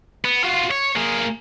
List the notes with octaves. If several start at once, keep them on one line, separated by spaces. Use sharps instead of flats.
B3
F4 F#4
C#5
A#3 G#4